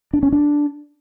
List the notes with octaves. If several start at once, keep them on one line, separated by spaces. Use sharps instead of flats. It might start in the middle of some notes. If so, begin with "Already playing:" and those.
D4
C#4
D4